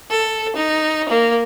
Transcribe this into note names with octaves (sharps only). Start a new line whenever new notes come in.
A4
D#4
A#3